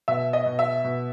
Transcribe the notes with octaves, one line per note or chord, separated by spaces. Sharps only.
B2 E5
D#5
B2
E5
B2